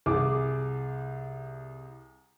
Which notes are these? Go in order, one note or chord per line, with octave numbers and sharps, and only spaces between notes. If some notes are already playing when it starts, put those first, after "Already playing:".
C2 G#4 D6